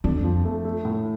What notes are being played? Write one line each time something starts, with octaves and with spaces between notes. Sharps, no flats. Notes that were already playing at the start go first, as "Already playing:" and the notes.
F2 D4
F3
A3
A3
A2